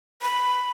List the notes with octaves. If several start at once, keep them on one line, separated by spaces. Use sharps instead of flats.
B5